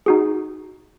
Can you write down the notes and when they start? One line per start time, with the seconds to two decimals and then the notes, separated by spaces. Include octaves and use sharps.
0.06 D#4 F#4 G#4